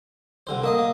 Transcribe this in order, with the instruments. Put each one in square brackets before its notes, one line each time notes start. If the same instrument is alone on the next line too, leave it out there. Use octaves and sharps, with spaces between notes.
[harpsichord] C2 D3 C5
[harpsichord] A#3 D#5 D#6 [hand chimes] A#4
[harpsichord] A#3